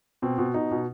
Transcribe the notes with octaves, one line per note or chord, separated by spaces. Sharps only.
B2 C4
B2
B2 D#4
B2